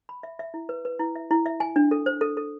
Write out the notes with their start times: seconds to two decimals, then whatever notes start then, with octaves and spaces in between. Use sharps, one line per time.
0.09 B5
0.23 E5
0.39 E5
0.54 E4
0.69 B4
0.85 B4
0.99 E4
1.16 E5
1.31 E4
1.46 E5
1.60 G#5
1.76 D4
1.91 A4
2.06 C5
2.21 A4
2.37 A4